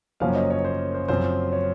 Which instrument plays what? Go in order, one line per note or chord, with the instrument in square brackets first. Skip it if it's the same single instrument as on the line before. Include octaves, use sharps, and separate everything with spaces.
[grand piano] F#1 F#2 F3 A#3 C#4 F5
D#5
C#5
C5
C5
F#1 F#2 F3 C4 C5
C#5